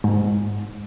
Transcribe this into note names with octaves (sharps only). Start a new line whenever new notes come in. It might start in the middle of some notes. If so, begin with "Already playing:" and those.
G#2